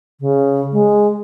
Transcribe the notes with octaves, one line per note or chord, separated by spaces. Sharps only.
C#3
G#3